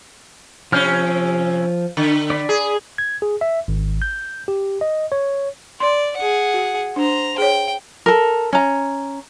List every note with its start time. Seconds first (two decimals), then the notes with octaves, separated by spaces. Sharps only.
0.72 C3 F3 C#4 F6 G6
1.97 D3
2.30 D5 B5
2.49 G#4
2.98 G#6
3.22 G#4
3.41 E5
3.68 G#1
4.02 G6
4.48 G4
4.81 D#5
5.12 C#5
5.80 D5 C6
6.17 G#4 F#5
6.54 F#4
6.96 D4 C5 A#5
7.38 G#4 C#5 G5
8.06 A4 A#4
8.53 C#4 A#5